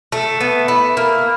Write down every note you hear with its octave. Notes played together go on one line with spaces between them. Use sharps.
A3
B3
E4
A#3